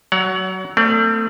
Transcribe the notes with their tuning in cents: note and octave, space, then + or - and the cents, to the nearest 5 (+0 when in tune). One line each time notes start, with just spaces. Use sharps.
F#3 +20 C#5 +40 F#5 +0
A3 +35 C4 -25 D5 +0